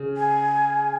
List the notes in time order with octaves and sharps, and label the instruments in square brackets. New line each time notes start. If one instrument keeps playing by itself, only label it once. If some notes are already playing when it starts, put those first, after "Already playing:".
Already playing: [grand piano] C#3
[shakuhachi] G#5